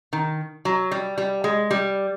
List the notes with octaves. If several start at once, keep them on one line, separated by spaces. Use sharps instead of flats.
D#3
F#3
G3
G3
G#3
G3